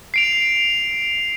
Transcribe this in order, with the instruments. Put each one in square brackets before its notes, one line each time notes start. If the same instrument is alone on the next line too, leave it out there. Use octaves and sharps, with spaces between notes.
[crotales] C7 D7 F7